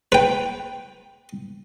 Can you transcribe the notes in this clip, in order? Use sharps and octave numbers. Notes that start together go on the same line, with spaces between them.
B4 G5